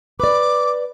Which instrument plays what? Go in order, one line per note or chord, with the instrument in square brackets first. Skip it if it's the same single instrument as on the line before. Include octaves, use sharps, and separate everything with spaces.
[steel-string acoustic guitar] B4 D5 [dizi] D6